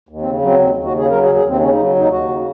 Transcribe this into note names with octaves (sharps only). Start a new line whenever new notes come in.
D#2
C4
C#3
F#3 C4
D#2 C4
D#2
F#4
C#3 G#4
F#3 A#4
G#4
D#2
G#4
D#2 C4
C#3 C#4
D#4
F#3
D#2 D#4
D#2 F#4
C#3